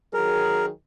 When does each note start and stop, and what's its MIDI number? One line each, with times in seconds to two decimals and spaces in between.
0.13 0.69 51
0.13 0.69 54
0.13 0.69 68
0.13 0.66 70